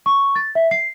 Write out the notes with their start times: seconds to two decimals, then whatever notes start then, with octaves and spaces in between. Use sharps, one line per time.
0.06 C#6
0.35 A6
0.55 E5
0.71 C7